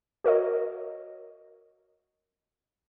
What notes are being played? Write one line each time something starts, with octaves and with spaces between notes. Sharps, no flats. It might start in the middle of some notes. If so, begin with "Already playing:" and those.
F#4 A#4 C#5 D#5